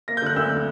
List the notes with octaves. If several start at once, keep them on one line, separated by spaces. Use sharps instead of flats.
A#3 A#6
G6
D3 F#6
D2 E6